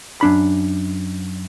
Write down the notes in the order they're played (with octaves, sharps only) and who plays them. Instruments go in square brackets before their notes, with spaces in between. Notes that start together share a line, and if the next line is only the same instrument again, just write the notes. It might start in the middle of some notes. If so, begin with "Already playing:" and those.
[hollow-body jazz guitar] F#2 D4 B5